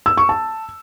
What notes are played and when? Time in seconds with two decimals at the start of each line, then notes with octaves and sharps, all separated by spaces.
0.06 E6
0.17 C#6
0.29 A5